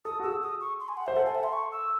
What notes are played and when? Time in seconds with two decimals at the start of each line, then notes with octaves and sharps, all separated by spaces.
0.05 A4 D#6
0.20 F#4
0.23 G#4 E6
0.42 D#6
0.61 C#6
0.80 C6
0.89 G#5
0.97 F#5
1.06 C5 E5
1.16 A4 F#5
1.26 G#5
1.35 E5
1.44 C6
1.53 C#6
1.72 E6